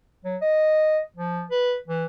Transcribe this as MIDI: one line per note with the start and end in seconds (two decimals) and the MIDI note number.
0.25 0.37 54
0.41 1.00 75
1.16 1.44 53
1.50 1.76 71
1.88 2.05 52